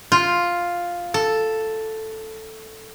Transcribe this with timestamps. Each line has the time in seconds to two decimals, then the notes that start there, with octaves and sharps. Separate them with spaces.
0.12 F4
1.14 A4